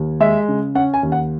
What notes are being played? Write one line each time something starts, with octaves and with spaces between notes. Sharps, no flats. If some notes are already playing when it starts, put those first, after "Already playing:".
Already playing: D#2
G#3 E5
C#3
C#4 F#5
G#5
D#2
F#5